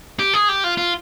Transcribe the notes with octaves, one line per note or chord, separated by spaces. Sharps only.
G4
G#4
G4
F4
F4